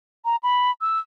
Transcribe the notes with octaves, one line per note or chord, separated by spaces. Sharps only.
A#5
B5
E6